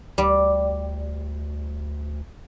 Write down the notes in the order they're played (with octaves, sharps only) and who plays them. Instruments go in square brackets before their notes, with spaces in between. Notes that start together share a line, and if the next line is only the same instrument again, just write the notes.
[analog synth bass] D2 [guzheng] G3